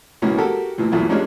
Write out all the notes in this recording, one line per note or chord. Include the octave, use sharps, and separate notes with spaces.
C#2 B2 E3 A#3 B3 C#4
F#4 G4 A4 A#4
D2 A#2 E3
B1 E2 A#2 A3 E4
G3 G#3 A#3 C#4 D4 F4